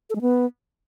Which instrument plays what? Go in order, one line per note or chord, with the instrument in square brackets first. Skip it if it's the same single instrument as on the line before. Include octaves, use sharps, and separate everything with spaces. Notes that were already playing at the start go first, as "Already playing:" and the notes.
[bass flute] A4
G#3
B3